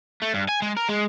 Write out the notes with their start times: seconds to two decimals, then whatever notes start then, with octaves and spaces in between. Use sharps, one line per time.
0.22 A3
0.34 G2
0.49 G#5
0.62 G#3
0.77 A#4
0.89 G#3